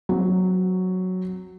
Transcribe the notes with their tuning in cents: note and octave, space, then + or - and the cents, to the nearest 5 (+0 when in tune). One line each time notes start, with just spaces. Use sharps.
F#3 +0 C4 +0